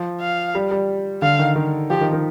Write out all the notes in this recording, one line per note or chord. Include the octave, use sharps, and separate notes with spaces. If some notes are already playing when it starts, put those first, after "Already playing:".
Already playing: F3
F5
G3
G3
D3 F5
D#3
D#3
F3 G4
D#3
D#3